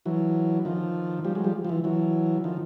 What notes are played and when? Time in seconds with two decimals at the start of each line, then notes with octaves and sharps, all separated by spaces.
0.06 E3 F#3
0.65 D#3 F3
1.24 F3 G3
1.35 F#3 G#3
1.44 F3 G3
1.65 F3
1.69 E3
1.84 E3 F#3
2.44 D#3 F3